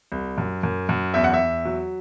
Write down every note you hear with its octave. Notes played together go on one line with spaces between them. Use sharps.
C2
F#2
F#2
F#2
E2 E5
F#5
E5
E2
F#3